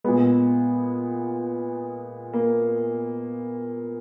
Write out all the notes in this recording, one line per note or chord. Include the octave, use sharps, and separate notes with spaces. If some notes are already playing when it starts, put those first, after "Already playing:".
A#2 G#3 B3
A#3